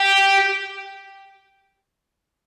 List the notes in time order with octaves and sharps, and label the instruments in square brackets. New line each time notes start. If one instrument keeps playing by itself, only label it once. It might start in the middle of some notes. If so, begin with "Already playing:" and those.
Already playing: [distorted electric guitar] G4